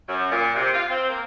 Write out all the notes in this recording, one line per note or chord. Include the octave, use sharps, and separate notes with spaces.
F#2
A#2
C3
F4
C4
A#3